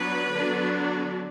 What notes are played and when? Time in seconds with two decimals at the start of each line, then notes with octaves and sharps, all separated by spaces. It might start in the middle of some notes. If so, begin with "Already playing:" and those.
Already playing: F#3 B3 D4 B4
0.31 D3 F#3 B3 D4